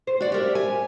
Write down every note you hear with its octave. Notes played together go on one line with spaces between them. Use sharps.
C5
F#4 D5
G4 A#4 E5
G#5